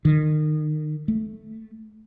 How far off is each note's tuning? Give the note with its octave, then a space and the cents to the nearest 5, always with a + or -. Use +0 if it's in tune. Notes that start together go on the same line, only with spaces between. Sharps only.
D#3 -30
A3 -5